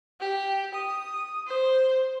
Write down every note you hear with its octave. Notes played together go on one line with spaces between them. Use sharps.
G4
D#6
C5